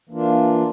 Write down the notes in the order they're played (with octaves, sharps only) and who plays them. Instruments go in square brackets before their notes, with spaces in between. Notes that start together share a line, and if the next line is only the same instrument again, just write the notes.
[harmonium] E3 A#3 D4 F4